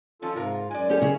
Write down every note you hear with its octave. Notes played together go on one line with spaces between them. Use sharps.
D#3 F3 C#4 F4 A4
G#2 C3 F4 A#4
F#2 G#3 D5 G#5
C#4 G4 A4
C#3